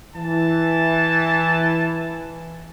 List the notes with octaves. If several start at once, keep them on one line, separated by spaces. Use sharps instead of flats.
E3 A5